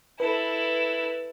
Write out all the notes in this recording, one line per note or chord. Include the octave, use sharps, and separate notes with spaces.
E4 A4 B4